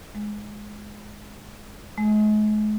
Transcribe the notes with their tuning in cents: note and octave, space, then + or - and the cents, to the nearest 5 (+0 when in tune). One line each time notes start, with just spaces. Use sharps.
G#3 +5
G#3 +40